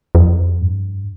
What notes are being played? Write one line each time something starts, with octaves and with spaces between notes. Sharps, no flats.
F2
G2